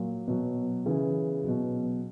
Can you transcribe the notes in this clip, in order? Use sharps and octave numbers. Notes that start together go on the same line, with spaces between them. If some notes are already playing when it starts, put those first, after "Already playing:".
Already playing: A#2 F#3
B2 F#3
C#3 E3
B2 F#3